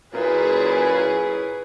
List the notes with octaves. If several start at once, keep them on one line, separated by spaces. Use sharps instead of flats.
F#2 A#2 C#4 E4 G#4 B4